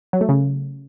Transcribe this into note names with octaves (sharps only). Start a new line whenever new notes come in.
F#3
A3
C#3